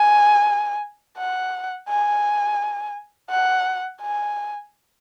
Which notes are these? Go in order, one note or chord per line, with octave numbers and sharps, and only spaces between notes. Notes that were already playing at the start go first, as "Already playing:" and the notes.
Already playing: G#5
F#5
G#5
F#5
G#5